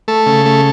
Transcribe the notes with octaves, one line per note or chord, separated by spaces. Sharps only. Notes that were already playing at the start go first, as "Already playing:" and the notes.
A3 A4
C#3
A3